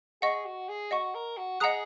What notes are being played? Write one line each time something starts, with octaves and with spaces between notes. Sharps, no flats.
G#4 D#5 F#5 C#6
F#4
G#4
F#4 D#5 F#5 C#6
A#4
F#4
G#4 D#5 F#5 A#5 D#6 F#6